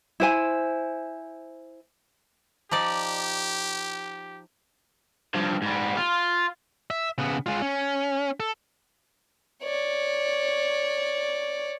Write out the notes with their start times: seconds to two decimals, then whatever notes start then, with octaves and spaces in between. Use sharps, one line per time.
0.20 E4 C5 G#5
2.71 F3 D#4 G4 D5
5.34 G2 F3
5.62 G#2 G3
5.97 F4
6.90 E5
7.18 C#3 B3
7.46 G#3 F4
7.62 C#4
8.40 A4
9.63 C#5 D5